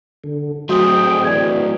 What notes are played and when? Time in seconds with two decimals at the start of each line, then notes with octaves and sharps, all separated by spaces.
0.24 D3
0.69 F#3 A3 C4 D4 F#4 G#4 D#5 G5
1.25 E3 D5 G#6